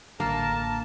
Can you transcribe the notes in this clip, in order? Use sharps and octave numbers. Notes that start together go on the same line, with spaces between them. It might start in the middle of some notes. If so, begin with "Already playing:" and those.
A1 D3 A#3 A#4 A5